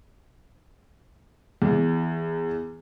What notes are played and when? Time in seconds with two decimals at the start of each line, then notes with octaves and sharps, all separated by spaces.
1.62 E2